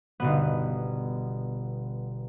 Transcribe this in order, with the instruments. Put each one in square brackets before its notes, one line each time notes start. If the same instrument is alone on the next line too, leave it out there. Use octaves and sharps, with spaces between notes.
[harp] G1 B2 B3